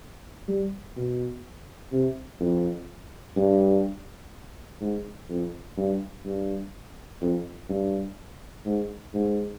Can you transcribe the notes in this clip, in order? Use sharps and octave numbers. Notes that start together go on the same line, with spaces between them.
G3
B2
C3
F2
G2
G#2
F2
G2
G2
F2
G2
G#2
G#2